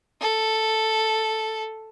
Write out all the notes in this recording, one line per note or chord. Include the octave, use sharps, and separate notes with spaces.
A4